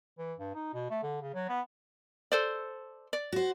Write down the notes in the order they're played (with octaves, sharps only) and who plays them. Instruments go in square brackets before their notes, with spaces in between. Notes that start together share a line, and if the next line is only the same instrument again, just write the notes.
[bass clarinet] E3
G2
D#4
B2
A3
D3
C#3
F#3
B3
[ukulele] A4 C5 D5
D5
[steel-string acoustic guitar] F#4 C5